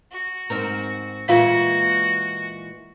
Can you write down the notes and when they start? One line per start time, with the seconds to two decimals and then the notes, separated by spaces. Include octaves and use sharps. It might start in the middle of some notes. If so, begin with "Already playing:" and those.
0.12 F#4
0.50 G#2 C4 A#4
1.28 A#2 E3 G#3 F4 F#4 F5 B6